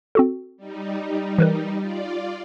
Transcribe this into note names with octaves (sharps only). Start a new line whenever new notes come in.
C4 F#4 A4
G3 D#4
E3 A#4 B4
F4 D5